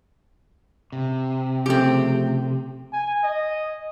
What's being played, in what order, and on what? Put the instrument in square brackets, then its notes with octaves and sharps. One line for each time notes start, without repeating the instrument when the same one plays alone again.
[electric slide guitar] C3
[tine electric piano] C#3 F3 A3 [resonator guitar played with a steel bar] C4 G4
[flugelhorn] G#5
D#5